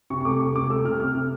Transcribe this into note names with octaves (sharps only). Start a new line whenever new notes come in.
C3 C#6
C#6
A3 D6
C3 C#6
C3 D6
A3 E6
C3 F6
C3 F6
C3